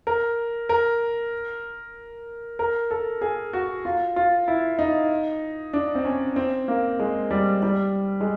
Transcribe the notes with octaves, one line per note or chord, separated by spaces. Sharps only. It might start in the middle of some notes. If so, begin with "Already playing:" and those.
A#4
A#4
A#4
A4
G#4
F#4
F4
F4
E4
D#4
D4
C4
C#4
C4
A#3
G#3
G3
G3
G#3